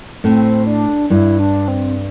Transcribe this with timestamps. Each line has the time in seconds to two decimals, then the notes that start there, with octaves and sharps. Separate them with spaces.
0.24 A2 C4
0.66 D4
1.10 G2 E4
1.39 D4
1.68 C4